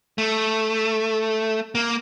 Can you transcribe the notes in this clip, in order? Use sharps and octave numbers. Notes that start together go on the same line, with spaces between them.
A3
A#3